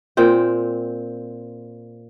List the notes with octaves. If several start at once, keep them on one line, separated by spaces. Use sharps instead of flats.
A#2 C4 G5